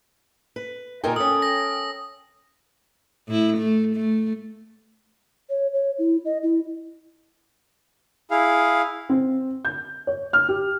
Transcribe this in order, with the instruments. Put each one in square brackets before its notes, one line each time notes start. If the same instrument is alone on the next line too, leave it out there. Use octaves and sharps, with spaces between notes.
[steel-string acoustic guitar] B4
[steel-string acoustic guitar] A#2 D#4 G#4 [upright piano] A#4 G5
[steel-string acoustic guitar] C#4 A4 [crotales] D#6
[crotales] A#6
[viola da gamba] A2 E4
A3
A3
[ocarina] C#5
C#5
E4
D#5
E4
[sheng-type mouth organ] E4 G#4 F5
[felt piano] C4
G6
C#5
F6
G4